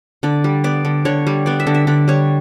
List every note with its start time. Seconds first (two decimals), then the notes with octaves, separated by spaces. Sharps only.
0.23 D3 D5
0.44 G3
0.64 B3 D5
0.85 D3
1.05 D3 C#5
1.27 G3
1.46 B3 D5
1.60 E5
1.67 D3
1.74 E5
1.87 D3 D5
2.08 G3 C#5